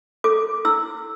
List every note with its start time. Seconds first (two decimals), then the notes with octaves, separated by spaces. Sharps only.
0.24 A4 D6
0.65 E4 E6